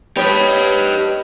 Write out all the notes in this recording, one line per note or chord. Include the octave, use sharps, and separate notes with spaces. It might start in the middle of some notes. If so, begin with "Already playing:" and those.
B3 G4 B4 C#5 D#5